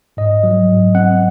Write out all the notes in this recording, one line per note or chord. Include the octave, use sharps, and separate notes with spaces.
G#2 D#5
F#3
G#2
C4 F#5